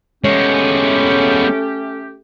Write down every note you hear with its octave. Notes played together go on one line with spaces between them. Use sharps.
G#3 A3 B3 C#4 G4 C#5